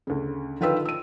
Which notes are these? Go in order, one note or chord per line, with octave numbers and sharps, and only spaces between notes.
D2 C#3
D3 D#3 F4 B4 G5 E6
E6 D#7